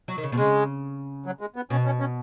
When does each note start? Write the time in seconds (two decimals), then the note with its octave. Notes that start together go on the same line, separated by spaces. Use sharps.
0.08 F#3
0.18 D#3
0.23 C#3
0.32 B2
0.37 C#3 G#3
1.26 F#3
1.41 G#3
1.56 B3
1.70 B2 C#4
1.86 C#4
2.00 C#4